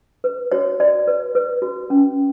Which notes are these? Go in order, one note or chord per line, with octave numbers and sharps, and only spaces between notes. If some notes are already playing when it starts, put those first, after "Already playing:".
B4
F#4 C#5
F#4 D5
B4
B4
F#4
C#4